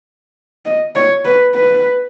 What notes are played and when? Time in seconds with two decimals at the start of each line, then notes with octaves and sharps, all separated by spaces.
0.65 D#5
0.95 C#5
1.25 B4
1.54 B4